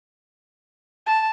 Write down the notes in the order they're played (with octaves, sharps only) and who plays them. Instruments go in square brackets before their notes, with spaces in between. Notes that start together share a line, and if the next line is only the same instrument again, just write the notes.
[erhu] A5